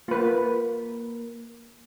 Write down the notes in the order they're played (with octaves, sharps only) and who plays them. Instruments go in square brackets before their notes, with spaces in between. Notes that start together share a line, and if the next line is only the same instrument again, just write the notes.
[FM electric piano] A#3 A#4 [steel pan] F4 B4